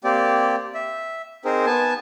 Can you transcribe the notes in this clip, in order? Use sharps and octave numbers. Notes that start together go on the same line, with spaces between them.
A#3 C4 G4 D5
E5
C4 D#4 G#4 A#4 C5
B3 G#5 A5